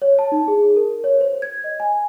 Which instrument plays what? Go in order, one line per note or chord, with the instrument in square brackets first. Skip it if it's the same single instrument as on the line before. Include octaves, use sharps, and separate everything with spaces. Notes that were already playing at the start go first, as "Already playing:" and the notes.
[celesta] C#5
A5
D#4
G#4
A#4
C#5
C5
G#6
D#5
G#5